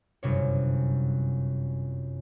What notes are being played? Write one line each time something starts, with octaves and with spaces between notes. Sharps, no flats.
G1 F#2 C3 C#5